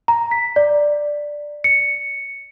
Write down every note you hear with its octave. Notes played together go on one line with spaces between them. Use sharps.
A#5
B6
D5
C#7